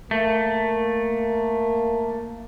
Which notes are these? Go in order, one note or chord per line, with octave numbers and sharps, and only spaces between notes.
A3 A#3